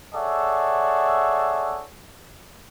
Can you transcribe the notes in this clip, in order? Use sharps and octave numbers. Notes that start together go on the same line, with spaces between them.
G#4 A4 C#5 D5 E5 F#5